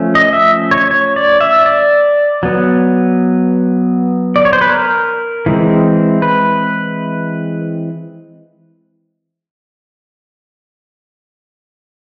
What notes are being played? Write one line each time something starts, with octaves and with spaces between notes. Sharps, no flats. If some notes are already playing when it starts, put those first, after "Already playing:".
Already playing: F3 A3 C#4
D#5
E5
C#5
C#5
D5
E5
D5
F#3 B3
D5
C#5
C5
B4
A#4
E3 G#3 C4
B4